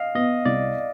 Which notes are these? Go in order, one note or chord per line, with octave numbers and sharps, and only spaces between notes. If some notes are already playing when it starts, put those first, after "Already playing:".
Already playing: D#5 F5
B3 D#5
C2 D5